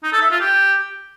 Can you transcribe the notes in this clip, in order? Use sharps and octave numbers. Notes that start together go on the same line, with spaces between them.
D#4
A4
E5
F4
G4